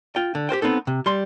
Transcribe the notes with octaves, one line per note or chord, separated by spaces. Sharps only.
F4 G5
D3
G4 A#4 C5 G5
B3 C4 D#4 A4
C3
G3 C6